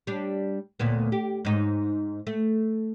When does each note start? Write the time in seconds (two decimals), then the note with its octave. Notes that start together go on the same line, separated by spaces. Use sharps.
0.07 G3 D4
0.79 D2 A#2 B3
1.12 G4
1.45 G#2 D#4
2.27 A3